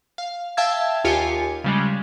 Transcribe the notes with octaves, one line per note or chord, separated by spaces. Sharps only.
F5
E5 F5 G5 A5 E6 G#6
D#2 F4 G4 G#5 C#7
C#3 G3 G#3